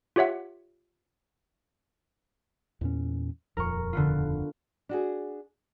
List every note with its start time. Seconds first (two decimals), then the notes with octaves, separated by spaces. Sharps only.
0.16 F4 G4 C#5 E5 F#5
2.81 E2 A#2 C#4
3.57 D#1 F2 A#4 C#6
3.93 D3 B3 F4
4.89 D4 F#4 G#4